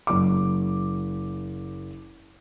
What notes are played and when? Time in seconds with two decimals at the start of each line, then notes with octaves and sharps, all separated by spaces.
0.07 F#1 D6